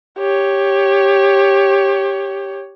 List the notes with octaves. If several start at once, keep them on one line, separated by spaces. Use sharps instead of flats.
G4 C#5